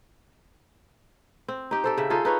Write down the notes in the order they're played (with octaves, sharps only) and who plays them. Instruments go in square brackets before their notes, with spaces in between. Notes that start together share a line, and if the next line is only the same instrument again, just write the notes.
[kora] C4
D#4 G4
G4 A4 C5
C#3 E5
D#4 F4 G#4 A4
D#4 B4 C#5